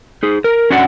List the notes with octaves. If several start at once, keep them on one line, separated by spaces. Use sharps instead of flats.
D#4 G#4
A#4
C#4 D4 F#4 F#5